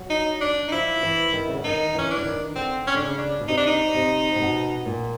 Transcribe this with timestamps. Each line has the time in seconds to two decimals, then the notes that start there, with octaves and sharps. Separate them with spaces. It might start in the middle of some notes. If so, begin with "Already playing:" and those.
Already playing: F#3
0.10 D#4
0.41 D4
0.68 D#4
0.72 F3 E4
1.03 E3
1.33 D#3
1.48 C#3
1.57 D3
1.64 D#3 D#4
1.95 E3 C#4
2.11 D4
2.17 E3
2.25 D#3
2.56 D3 C4
2.87 C#4
2.94 D3 D4
3.02 C#3 C#4
3.18 D4
3.41 B2
3.48 C3 D#4
3.58 D4
3.67 D#4
3.94 C3
4.36 C3
4.41 B2
4.86 A#2